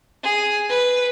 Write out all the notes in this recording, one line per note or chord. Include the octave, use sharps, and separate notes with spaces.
G#4
B4